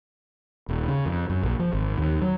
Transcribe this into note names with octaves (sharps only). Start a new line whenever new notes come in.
D#1
C#3
F2
F#2
A#1
F3
G#1
D#2
F#3